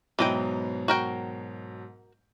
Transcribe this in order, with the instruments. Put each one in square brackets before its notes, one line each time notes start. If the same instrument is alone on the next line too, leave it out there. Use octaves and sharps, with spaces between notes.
[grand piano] G#2 B2 F#3 [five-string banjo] E3 D#5 G5
[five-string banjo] F#4 A#4 G5